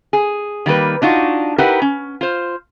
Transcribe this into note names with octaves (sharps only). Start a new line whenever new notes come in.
G#4
D#3 G3 A#3 B4
D4 D#4 F4 F#4
D#4 E4 G4 A#4 B4 F#5
C#4
F4 C5